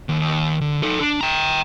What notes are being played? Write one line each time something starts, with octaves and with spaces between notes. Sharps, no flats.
D#2
D3
D#4 A4
D4
G5 A#5